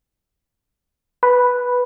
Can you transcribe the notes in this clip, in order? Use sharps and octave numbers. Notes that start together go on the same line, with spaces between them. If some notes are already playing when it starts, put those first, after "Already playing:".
B4